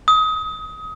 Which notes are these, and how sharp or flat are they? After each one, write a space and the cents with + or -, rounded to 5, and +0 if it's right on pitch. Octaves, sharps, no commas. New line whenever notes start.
D#6 +25